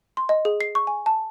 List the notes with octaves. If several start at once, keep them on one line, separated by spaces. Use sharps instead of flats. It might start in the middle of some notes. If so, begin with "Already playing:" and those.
C6
D#5
G#4
C7
C#6
G#5
A5